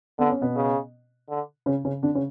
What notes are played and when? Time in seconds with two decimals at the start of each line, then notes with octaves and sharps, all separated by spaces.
0.18 D3 B3
0.30 C#4
0.41 B2 B3
0.55 C#3
1.29 D3
1.66 C#3 C#4
1.85 C#3 C#4
2.03 D3 D4
2.15 C#3 C#4